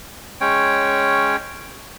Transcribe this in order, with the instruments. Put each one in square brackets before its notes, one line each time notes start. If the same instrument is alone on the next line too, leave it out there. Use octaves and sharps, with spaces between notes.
[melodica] G#3 C#4 C#5 G5